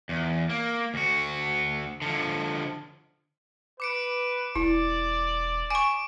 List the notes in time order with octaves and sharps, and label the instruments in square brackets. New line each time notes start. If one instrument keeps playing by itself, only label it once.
[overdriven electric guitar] E2
A#3
D2 F#4
D3 F3
[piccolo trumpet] B4 [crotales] D6 C#7 D7
[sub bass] E1 [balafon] E4 [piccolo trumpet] D5
[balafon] G#5 C#6 [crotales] D6 D7